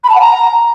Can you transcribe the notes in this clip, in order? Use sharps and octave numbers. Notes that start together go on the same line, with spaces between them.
B5
A5
F#5
A#5